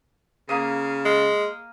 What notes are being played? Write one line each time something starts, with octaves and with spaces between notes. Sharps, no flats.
C#3 A#3 F5 D#6
G#3